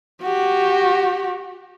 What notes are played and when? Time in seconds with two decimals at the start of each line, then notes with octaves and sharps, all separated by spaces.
0.22 F#4 G4